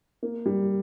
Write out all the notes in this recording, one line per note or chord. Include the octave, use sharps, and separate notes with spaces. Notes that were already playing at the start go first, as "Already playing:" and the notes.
A#3
G3